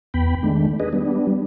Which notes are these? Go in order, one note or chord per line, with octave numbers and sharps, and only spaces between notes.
E2 B3 G5 B5
D#3 G#3 A3 D4
D4 G#4 B4 D#5
G3 B3 D4